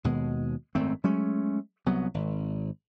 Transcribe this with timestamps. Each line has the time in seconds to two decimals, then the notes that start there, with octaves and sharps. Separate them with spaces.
0.04 D#2 B2 G#3
0.75 G#1 F#2 A3 C4
1.04 F#3 G#3 A3 C#4
1.86 C2 F#3 B3
2.14 G#1